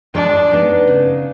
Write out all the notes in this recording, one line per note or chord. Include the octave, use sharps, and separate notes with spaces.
G#3 D4
B3 D#4
C#3